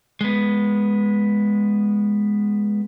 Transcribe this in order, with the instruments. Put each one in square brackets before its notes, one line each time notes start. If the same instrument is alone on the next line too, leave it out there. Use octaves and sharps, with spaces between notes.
[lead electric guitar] G#3 B3